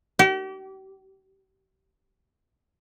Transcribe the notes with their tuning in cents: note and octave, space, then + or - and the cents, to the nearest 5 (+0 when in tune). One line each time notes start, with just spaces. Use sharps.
G4 -40